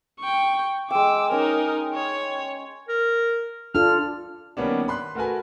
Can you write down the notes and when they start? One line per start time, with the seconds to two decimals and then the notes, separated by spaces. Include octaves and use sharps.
0.20 G5 C#6
0.91 G#3 G5 D6 E6
1.31 C#4 D#4 A#4
1.94 C#5
2.89 A#4
3.75 D4 F4 A4 F6
4.57 D#3 G3 A#3 B3 C#4 D4
4.88 B5 C6 F#6
5.15 A3 F#4 A#4 B4 G#5